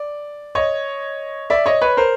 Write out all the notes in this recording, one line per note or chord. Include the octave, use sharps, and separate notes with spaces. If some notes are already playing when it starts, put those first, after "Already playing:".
Already playing: D5
C#5 D#5
D5 E5
C#5 D#5
B4 C#5
A#4 C5